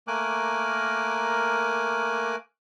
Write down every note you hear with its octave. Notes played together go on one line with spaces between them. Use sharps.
A3 A#3 A#4 G#5 D6 F#6